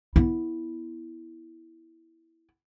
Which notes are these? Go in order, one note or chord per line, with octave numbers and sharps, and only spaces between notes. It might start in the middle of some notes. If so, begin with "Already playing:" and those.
B3 E4